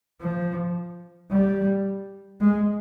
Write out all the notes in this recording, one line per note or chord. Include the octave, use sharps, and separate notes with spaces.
F3
G3
G#3